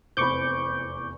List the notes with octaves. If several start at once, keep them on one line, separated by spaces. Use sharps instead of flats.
F1 E2 C4 B5 C#6 D6 G6